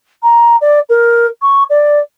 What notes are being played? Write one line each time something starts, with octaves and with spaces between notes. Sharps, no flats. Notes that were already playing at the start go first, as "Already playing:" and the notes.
A#5
D5
A#4
C#6
D5